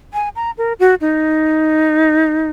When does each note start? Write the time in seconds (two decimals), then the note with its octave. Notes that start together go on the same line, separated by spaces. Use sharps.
0.14 G#5
0.36 A#5
0.58 A#4
0.79 F#4
1.01 D#4